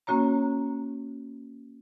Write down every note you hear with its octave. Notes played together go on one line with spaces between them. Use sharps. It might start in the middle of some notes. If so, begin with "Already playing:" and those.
A#3 C#4 F#4 C#5 A#5